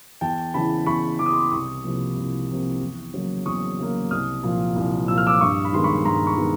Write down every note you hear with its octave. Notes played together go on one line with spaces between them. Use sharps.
E2 G5 A5
C#3 E3 A5 B5
E2 B5 C#6
C#3 E3 D6
D#6
C6 D6
C2 C#6 D#6
C3 F3 A#3
C2
C3 F3 A#3
E2
C#3 F#3 A#3
E2 C#6 D#6
C#3 F#3 A#3
C2 D#6 F6
A#2 F3
C2
A#2 F3 E6
F6
D6 E6
G2 C#6 D#6
B5
D#3 G#3 B3 C6
B5 C#6
G2 A#5 C6
B5 C#6
D#3 G#3 B3